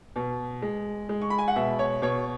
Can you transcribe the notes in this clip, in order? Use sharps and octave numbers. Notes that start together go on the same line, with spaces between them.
B2
G#3
G#3
C#6
B5
G#5
F#5
B2 E5
C#5
B2 C#5